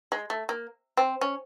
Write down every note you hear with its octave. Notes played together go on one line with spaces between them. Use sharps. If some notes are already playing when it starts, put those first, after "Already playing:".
G#3
A3
A#3
C4
C#4